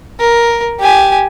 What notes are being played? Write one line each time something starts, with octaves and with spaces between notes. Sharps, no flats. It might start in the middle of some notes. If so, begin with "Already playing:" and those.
A#4
G4 G#5